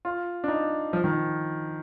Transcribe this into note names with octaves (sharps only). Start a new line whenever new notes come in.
F4
D4
D#4
F3
D#3